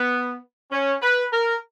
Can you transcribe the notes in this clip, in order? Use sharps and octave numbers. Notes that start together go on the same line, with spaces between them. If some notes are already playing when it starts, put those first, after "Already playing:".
Already playing: B3
C#4
B4
A#4